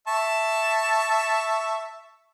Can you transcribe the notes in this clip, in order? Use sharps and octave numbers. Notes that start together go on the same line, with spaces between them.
E5 A5 C#6